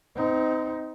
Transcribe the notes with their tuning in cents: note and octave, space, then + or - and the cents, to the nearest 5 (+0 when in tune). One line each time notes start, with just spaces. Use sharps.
C4 -30 D#4 +15